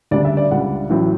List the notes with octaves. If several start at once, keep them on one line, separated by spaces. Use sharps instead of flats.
D2 C#3 G3 D4 D5
E5
D5
C#2 C#3 G3 D4 F#5
A1 A2 F#3 C#4